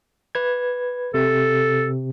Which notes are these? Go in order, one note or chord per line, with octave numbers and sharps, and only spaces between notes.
B4 G#6
C3 A4